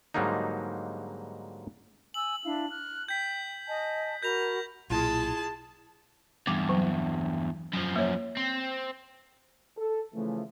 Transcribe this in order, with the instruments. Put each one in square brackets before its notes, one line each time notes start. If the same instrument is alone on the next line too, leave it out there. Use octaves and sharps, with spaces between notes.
[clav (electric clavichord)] G#2 D3 F#3 G3 A#3 D#4
[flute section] G#5 E6 [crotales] F#7
[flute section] D4 E4 F5
F6 F#6
[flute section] G5 [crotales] G6 B6
[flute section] D#5 G#5 A5
[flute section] F#4 A#4 B5 [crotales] G6 A#6 F7
[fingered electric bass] B1 A#2 [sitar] G#3 F4 [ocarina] E4 [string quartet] A5
[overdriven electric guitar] E2 G2 [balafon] D6
[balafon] F#3
[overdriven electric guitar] F#2 F3
[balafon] A#3 C#5
[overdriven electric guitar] C4
[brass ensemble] A4
C#3 E3 F3 A3